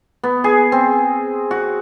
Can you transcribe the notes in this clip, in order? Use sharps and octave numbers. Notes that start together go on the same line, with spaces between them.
B3
G#4
C4
F#4